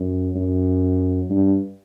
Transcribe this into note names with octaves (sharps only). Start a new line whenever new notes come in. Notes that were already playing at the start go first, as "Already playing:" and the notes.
Already playing: F#2
F#2
G2